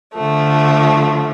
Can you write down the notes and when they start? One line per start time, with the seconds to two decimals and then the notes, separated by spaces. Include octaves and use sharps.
0.15 D3 F3 A3